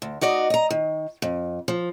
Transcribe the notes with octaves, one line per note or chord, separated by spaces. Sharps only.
D2
D#4 F#4 D5 D#5
D#5 A#5
D#3
F2
F3